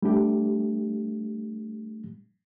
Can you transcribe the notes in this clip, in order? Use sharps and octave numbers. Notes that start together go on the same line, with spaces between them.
G3 A3 D4 G4